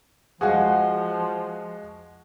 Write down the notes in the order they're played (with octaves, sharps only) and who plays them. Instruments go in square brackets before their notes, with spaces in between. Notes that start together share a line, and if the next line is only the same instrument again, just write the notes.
[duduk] F3 [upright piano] G#3 F#4 [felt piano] G#4 F5 F#5